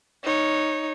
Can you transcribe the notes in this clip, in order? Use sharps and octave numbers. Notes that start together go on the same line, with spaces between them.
D#4 C#5